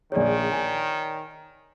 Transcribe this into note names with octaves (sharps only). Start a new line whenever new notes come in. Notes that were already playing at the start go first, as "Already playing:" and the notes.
A#1 D#3 G#4 C#5 D5
G#5